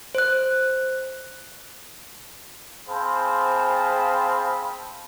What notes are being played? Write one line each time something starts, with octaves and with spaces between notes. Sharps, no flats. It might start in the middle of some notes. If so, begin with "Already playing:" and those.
C5 F#6
C4 G#4 C5 F5 A5 B5